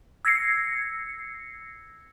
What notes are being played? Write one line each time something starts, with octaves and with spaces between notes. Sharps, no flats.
E6 G#6 A#6 C7 C#7